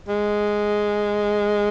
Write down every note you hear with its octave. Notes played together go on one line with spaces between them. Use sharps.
G#3